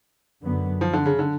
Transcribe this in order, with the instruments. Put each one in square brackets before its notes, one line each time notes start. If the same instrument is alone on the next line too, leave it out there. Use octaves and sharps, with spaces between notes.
[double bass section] F#2 D3 F#3 B3
[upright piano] F3
D3
C#3
D3